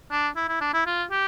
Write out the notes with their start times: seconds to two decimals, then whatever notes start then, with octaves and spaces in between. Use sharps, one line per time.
0.11 D4
0.36 E4
0.49 E4
0.61 D4
0.73 E4
0.86 F4
1.11 G4